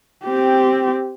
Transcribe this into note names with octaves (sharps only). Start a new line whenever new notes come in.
C4 G4